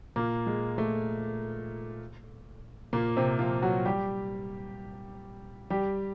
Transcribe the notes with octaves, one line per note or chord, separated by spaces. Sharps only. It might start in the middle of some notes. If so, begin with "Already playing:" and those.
A#2 A#3
G#3
A3
A#2 A#3
C3 C4
F3 F4
F#3 F#4
G3 G4
G3 G4